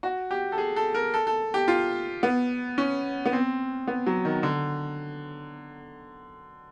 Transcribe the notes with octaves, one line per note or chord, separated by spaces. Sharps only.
F#4
G4
A4
G#4
A4
A#4
A4
A4
G4
F4
B3
C#4
B3
C4
B3
F#3
D#3
D3